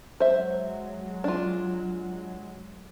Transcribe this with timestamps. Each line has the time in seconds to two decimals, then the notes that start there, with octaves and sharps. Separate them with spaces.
0.20 F#3 G#3 C5 E5
1.24 D4 F4